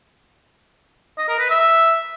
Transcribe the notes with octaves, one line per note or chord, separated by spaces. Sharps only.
D#5
A#4
B4
E5